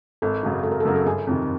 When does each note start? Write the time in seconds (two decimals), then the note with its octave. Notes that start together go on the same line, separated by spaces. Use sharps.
0.22 G#1 A4
0.43 F#2 C#3 F#3
0.63 G#1 A4
0.71 A#4
0.80 A4
0.85 F#2 C#3 F#3 A#4
0.95 A4
1.06 G1 G#4
1.27 F2 C3 D#3